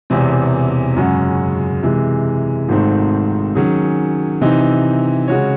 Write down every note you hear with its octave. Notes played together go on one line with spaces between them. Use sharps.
E1 E2 C3 E3 C4
F#2 C#3 G#3 C#4 F#4
C3 E3 G#3
G#1 G#2 D#3 A3 C4
D#3 F#3 C#4 G#4
C3 E3 C4 D#4
C#3 G#3 C#4 F#4 C#5